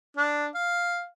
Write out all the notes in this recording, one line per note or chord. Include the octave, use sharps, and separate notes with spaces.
D4
F5